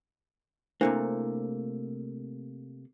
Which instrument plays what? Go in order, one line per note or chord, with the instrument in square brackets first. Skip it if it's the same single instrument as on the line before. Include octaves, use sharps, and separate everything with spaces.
[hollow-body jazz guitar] C3 A3 A#3 [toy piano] D4 E4 C5